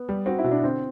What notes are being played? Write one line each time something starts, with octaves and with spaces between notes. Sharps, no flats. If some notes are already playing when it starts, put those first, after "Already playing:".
Already playing: B3
G3
C4 F#4
E4
B2
D4
D3 C4